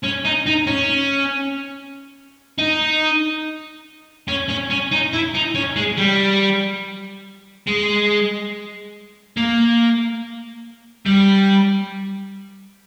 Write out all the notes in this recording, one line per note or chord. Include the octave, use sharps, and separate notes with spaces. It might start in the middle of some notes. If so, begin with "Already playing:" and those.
C#4
D#4
D#4
C#4
D#4
C#4
C#4
C#4
D#4
E4
D#4
C#4
G#3
G3
G#3
A#3
G3